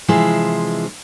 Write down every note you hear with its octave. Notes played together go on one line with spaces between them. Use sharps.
C3 E3 F3 G#3 E4 C5